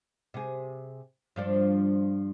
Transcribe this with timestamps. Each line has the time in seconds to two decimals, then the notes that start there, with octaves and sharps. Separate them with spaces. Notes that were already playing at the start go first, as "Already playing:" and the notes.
0.34 C3 G#4
1.36 G2 F3 D4